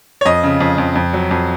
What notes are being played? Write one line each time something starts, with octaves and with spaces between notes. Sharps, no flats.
C#5
F2 D#5
C#3
F2
F2
F2
F#3
F2